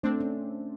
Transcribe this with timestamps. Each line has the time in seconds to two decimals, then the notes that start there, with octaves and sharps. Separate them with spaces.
0.03 A3 C4 D4
0.20 C#4